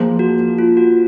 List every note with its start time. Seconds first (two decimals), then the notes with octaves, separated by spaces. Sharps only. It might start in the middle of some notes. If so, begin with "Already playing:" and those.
Already playing: F3 A#3 F4 G#4
0.19 F#4
0.58 F4
0.77 F#4